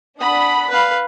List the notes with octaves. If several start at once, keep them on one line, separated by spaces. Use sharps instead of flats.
D4 F#5 B5 D#6
B4 F5